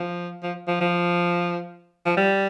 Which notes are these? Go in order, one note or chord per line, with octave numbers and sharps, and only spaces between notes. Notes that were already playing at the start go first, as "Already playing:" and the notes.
Already playing: F3
F3
F3
F3
F3
G3